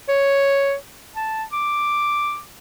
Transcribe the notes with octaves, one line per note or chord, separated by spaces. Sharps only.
C#5
A5
D6